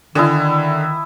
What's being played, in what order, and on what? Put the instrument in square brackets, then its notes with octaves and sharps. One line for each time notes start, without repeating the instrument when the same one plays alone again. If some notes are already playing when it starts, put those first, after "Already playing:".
[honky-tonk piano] D3 [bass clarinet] D#3 [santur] E4 D#5 G#5